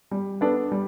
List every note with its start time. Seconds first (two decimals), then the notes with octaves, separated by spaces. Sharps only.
0.11 G3
0.41 B3 D4 A4
0.72 G3